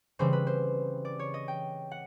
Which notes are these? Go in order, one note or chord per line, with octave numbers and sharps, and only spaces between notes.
C#3 E3 G3 C4 C5
B4
C5
D5
C#5
D#5
G5
F#5